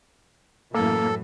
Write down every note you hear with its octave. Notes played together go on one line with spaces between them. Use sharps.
F#2 A2 E3 A#3 A4